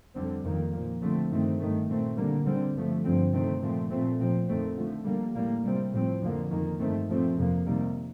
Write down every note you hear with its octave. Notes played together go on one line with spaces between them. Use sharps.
F2 D3 G3 C4
F2 D#3 A#3
A#2 F3 A#3
D3 F3 A3 C4
G2 D#3 A3 C4
G2 D#3 A3
A#2 A3 C4
D3 G3 A#3
D3 G3 C4
G2 D3 F3 A3
G2 D3 F3 C4
C3 D#3 A3 C4
A#2 F3 A3 C4
A#2 F3 A3 C4
A#2 F3 C4
F2 D#3 A3 C4
D3 F3 A3
D3 G3 A#3
A2 G3 A#3
C3 G3 C4
A2 F3 C4
F2 D3 F3 A#3
F2 D#3 A#3
G2 D#3 A3 C4
A#2 F3 A3 C4
F2 C3 F3 A#3
C3 D#3 G3 A#3